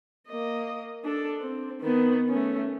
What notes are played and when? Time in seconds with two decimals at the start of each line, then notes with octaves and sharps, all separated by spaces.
0.27 A#3 D#5
1.05 D4 A4
1.41 C4
1.81 D#3 B3
2.29 A3 C#4